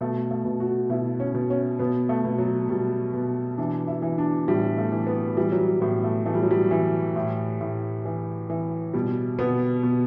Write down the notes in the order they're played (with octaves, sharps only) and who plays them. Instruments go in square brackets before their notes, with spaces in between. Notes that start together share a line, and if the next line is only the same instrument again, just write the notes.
[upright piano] B2 A3
A3
B2
F#4
B2 E4
C#4
B2
C#4
B2 B3
A3
B2
F#3
B2 G3
B2
E3 D4
E4
E3
D4
A2 G3
A3
E3
B3
E3 G3
F#3
G3
A2 B3
A3
E3 A3
G3
F#3
G3
E3
A2
A2
E3
E3
B2 G3
B2 B3
B2